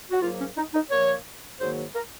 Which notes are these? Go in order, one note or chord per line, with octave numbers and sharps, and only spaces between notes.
F#4
G#2 F#3 A#3 F4
C#4
D#4
D#4
A#2 F3 A#3 C#5
G#2 D#3 F#3 A#3 C5
A#4